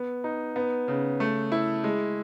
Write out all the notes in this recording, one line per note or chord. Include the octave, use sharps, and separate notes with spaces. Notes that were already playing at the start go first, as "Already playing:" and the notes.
Already playing: B3
D#4
B3
C#3
A3
E4
G#3